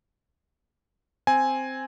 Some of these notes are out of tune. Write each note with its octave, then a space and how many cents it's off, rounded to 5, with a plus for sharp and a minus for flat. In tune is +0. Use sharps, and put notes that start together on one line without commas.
C4 +0 G#5 +0